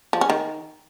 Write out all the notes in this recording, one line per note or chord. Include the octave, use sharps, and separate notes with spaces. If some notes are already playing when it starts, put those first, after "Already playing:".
F3
C#4
D#3